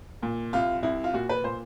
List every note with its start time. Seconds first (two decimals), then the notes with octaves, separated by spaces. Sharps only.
0.23 A#2
0.53 C2 F4
0.83 C2 E4
1.04 F4
1.14 A#2 F#4
1.29 B4
1.44 A#2 C5